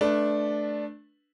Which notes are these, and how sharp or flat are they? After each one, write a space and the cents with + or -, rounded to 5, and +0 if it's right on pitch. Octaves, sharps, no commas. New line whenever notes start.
A3 -15 D4 +0 B4 -10